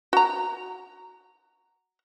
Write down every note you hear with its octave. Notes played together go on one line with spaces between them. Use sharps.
F#4 A#5